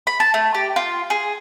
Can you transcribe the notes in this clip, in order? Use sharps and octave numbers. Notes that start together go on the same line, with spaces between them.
B5
A5
A3
G4
F4
G#4